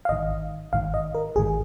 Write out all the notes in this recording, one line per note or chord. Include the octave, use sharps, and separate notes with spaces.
F5
G#1 G#2 D#3 D#5
G#1 G#2 D#3 F5
D#5
A#4
G#1 G#2 D#3 G#4